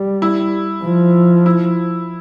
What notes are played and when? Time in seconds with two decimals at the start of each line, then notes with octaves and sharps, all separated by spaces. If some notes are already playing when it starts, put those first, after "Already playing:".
Already playing: G3
0.22 E4
0.83 F3
1.46 E4